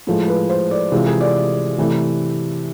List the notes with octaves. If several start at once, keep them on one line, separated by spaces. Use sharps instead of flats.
A2 F3 G#3
B4
C5
D5
C3 E3 G#3 F4
G#4
D5
C3 E3 A3